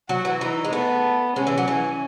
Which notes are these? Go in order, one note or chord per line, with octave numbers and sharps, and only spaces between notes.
F#3 F#4
E3
E3 D#4
G#3
A3 B3
G#3 C#4
E3
F#3
E3 C#4